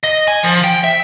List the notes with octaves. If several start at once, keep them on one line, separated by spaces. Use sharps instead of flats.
D#5
G#5
F3
G5
E5